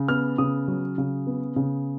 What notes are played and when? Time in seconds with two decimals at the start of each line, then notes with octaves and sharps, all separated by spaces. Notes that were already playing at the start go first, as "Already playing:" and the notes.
Already playing: C#3
0.08 B3 F6
0.38 C#3 D#6
0.68 F#3
0.98 C#3
1.27 B3
1.56 C#3